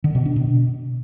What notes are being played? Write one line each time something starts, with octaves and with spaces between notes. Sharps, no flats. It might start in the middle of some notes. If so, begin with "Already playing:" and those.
D3
B2
D4
B2